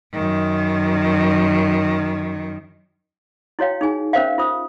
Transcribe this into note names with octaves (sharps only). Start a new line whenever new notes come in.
F#2 D#3
E4 F#4 C#5 F5 G5
D#4 G#4 G#5
C#4 A#4 C5 E5 F5
F4 C5 D#6